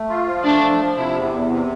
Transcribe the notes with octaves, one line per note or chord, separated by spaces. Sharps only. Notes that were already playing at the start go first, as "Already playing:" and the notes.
Already playing: A3
F4
F3
A3 D4
F3
F3
C3 E4
E2
E2
C3